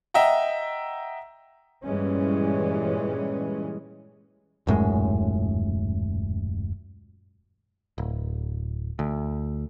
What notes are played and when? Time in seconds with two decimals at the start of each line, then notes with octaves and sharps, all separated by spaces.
0.14 D#5 E5 F#5 G5 A#5
1.84 G2 A#2 E3 G3 G#3 C#4
4.67 D#1 F#2 A2 G#3
7.98 D1
8.99 D2